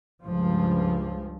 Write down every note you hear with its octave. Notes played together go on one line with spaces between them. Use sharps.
C#2 G2 F3